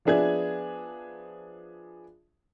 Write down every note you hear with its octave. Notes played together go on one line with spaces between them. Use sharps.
F3 B3 D4 G#4 E5 G#6